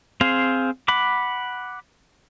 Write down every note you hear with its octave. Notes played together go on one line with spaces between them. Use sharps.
C4 G#4 C5 F5
F#5 B5 D6